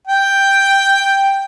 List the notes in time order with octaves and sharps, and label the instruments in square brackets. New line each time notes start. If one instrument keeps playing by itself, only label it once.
[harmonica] G5